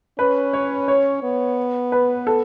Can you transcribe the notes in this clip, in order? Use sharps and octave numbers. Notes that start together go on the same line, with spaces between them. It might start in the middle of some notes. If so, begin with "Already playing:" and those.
C#4 B4
C#5
C#5
B3
B4
A4